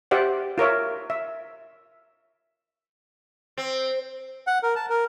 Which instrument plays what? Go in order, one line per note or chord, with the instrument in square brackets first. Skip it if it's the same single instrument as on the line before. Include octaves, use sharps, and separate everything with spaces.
[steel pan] G4 C5 D5 E5 F#5
F4 A#4 C#5 E5
E5
[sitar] C4
[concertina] F#5
A#4
A5
A#4